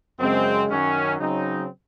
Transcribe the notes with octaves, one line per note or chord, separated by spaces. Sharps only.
F#2 C#3 G#3 C4
F#2 D#3 F#3 C#4
C#3 F#3 C4 D#4